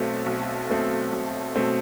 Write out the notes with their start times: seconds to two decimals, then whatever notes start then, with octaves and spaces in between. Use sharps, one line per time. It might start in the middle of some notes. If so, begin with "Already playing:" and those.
Already playing: B1 B2 A3 C4
0.26 B1
0.69 B2 A3 C4
1.12 B1
1.56 B2 A3 C4